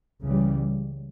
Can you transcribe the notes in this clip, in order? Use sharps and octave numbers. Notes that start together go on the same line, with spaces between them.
C#2 C#3 E3 G3